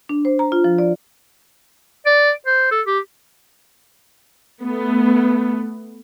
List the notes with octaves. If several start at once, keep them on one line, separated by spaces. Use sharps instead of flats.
D4
C5
A#5
F4
F3
D5
D5
C5
A4
G4
A3 B3